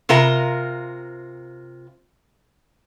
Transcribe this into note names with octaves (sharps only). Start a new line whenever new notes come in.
C3 F4 A#4 A#5